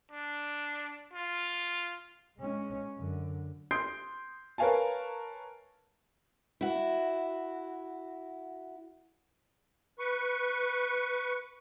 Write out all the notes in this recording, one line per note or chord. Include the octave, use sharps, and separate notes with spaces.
D4
F4
G#3 C#4
F#2 D3
C6 D#6 G6 C7 D7
A#4 B4 C#5 F5 G#5 A5
E4 F#4
B4 C#6